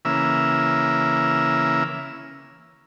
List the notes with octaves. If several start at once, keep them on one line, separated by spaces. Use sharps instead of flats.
C#3 E3 A#3 E5